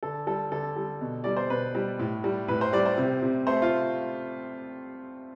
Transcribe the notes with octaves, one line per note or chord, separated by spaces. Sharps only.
D3 A4
G3 A4
D3 A4
G3
B2
G3 D5
C5
B2 B4
G3
A2
G3
A2 B4
C5
G3 D5
C5
C3
C3
A3 C5
F4